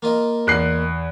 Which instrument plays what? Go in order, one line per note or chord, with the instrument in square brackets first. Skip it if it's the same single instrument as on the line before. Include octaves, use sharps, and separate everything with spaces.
[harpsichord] A#3 F4 D#5
[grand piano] E2 F#6 C7